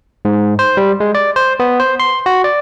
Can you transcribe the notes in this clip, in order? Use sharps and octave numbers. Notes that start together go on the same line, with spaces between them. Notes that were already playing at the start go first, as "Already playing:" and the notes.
G#2
C5
G3
G#3
D5
C5
B3
C5
C6
F#4
D5